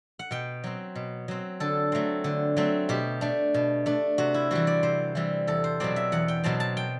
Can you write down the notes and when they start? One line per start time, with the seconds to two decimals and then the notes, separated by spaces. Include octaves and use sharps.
0.19 F#5
0.31 B2 G5
0.64 F#3 C4
0.95 B2
1.28 F#3 C4
1.60 D3 A4
1.92 F#3 A3 C4
2.24 D3
2.56 F#3 A3 C4
2.89 B2 G4
3.21 A3 D4
3.54 B2
3.86 A3 D4
4.18 C3 F#4
4.34 E4
4.51 E3 G3 C4 F#4
4.67 D5
4.83 C3 C5
5.15 E3 G3 C4
5.47 E2 A4
5.64 C5
5.80 B2 F#3 C4 D5
5.96 E5
6.12 E2 F#5
6.28 G5
6.44 B2 F#3 C4 A5
6.60 A5
6.77 G5